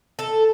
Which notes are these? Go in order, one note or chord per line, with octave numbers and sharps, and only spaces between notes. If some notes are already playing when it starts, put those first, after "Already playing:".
A4